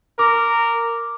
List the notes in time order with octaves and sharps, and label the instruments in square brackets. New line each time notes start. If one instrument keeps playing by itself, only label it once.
[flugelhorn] A#4 [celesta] D6